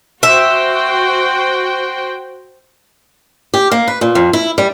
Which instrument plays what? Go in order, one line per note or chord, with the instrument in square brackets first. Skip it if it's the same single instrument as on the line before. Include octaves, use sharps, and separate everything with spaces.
[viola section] F#4 C5 G5 [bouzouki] E5
[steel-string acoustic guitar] G4
A#3
B4
A#2
F2
E4
G3